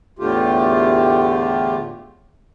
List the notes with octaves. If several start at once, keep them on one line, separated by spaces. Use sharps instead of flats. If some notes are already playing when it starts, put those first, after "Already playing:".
E2 A2 D3 A3 F4 G4